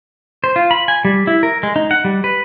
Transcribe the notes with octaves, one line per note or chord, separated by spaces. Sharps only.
C5
F4
B5
G#5
G3
E4
A#4
G#3
D#4
F#5
G3
B4